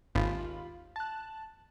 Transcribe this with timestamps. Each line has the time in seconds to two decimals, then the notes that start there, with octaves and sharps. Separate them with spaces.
0.15 G#1 D#2 F4 B5
0.96 A5 F#6